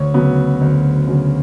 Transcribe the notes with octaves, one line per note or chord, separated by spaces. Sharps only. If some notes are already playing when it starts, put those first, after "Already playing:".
Already playing: D2 C#5
C#3 F#3 B3
D2
C#3 F#3 B3